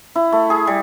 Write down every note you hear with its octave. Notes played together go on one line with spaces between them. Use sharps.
E4
A3
G#4
G3